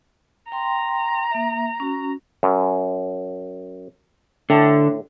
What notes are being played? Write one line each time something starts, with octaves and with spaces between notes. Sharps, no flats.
G5 A#5 C6
A#3 E5
C#4 F#4
F#2
A2 D3